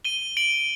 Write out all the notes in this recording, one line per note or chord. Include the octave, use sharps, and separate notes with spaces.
D#7 G7
D7 F#7